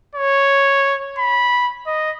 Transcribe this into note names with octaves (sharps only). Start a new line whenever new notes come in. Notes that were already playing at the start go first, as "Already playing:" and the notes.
C#5
B5
D#5